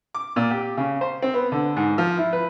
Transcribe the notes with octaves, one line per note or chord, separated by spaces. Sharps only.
D6
A#2
G4
C#3
C5
C4
B3
D3
G#2
F3
E4
B4